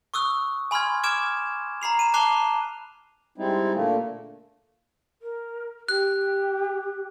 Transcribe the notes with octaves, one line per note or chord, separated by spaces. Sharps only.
C#6 D#6 E6 F#6
G#5 B5 C6 F6 G#6
D6 F6 G#6 D7 E7
A#5 B5 C7 F7
D#7 E7
A5 D6 F#6 C7 F7 G7
G3 G#3 C4 D#4 E4
A#2 D3 A3 A#3
A#4
G4 F#6